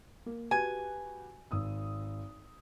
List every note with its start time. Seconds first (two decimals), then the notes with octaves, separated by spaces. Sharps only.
0.26 A#3
0.51 F#4 G4 B4 G#5
1.51 G#1 D#6 E6